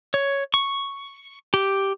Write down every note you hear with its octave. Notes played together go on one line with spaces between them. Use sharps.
C#5
C#6
G4